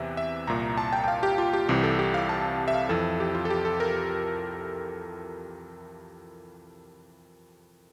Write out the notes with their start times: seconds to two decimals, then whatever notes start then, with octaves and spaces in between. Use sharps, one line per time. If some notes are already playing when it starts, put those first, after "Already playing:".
Already playing: E2 C3 E3 E5
0.17 E5
0.47 C2 A#2 A#5
0.78 A5
0.93 G5
1.04 G5
1.08 F5
1.23 G4
1.38 F4
1.53 G4
1.68 C2 C3 E3 G4
1.83 A4
1.99 G4
2.14 F5
2.29 A5
2.68 E5
2.74 F5
2.89 F2 E3 A4
3.20 G4
3.35 F4
3.45 A4
3.50 G4
3.65 A4
3.80 A#4